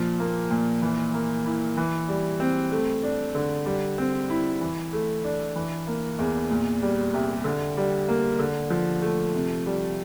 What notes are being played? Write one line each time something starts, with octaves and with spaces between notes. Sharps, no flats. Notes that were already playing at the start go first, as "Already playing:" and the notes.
Already playing: A#2 F3
A#3
A#2
E3
A#3
E4
E3
G3
C4
A3
D4
D3
G3
C4
E4
E3
A3
D4
E3
A#3
E2
A#2
G3
C2
D3
G3
A#3
D3
F3
A3
C3
G3